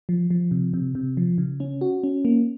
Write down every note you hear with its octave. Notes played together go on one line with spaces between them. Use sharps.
F3
F3
C3
C3
C3
F3
C#3
C#4
F#4
C#4
A#3